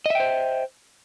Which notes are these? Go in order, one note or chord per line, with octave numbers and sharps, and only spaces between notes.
C5 D#5 E5 G5